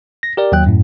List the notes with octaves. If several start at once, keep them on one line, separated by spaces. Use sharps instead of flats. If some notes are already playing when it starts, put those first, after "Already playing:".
A#6
G4 A#4 D5
D#2 F#3 G5 F#6
F#2 A2